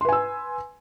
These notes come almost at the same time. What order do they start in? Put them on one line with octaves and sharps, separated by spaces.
C6 B4 G#5 E6